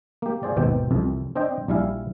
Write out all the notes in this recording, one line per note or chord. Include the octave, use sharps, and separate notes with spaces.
A#3 G4
F4 G#4 C5 D5
G#1 D#2 B2 C4 G5
C2 F2 C3
C4 D4 C5 D#5 G5
A#1 G3 E4 F5 G#5